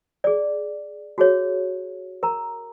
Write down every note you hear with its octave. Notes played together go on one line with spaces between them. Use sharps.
G#4 D5
F#4 G#4 C#5
A#4 A#5